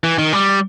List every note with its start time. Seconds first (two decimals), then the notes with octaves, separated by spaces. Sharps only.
0.04 E3
0.18 D#3
0.33 G3